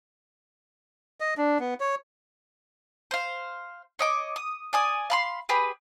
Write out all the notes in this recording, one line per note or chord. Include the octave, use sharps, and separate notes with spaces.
D#5
D4
B3
C#5
C5 F5
C#5 D#5 D6
D#6
D5 G#5 D#6
F5 B5 C6
G4 G#4 B4